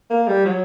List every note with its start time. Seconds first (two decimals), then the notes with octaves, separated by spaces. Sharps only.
0.10 A#3
0.28 G3
0.46 F#3